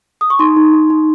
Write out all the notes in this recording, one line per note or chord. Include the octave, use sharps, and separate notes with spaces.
D#6
C#6
D#4 C6
D#4
D#4
D#4